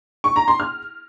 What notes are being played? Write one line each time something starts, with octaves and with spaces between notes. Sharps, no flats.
C#6
A#5
C6
F6